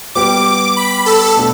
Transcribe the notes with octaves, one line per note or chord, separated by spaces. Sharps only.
G3 B3 G4 D6
B5
A4
B2 A3 D4